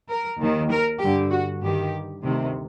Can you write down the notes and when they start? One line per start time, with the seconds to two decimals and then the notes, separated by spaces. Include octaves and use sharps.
0.10 A#4
0.39 D#2 D#3
0.70 A#4
1.01 G2 D3 G4
1.31 F#4
1.62 G2 D#3 G4
2.23 D2 C3 D#3